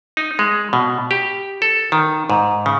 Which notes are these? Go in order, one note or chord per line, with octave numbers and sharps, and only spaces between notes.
D#4
G#3
B2
G4
A4
D#3
G#2
C#3